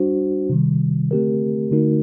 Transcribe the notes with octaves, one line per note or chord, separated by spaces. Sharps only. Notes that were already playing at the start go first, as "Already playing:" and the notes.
Already playing: G3 D4 F#4 C5
C3 D#3 G3
D3 A3 C4 G4 A#4
D3 A3 D#4 F#4 A#4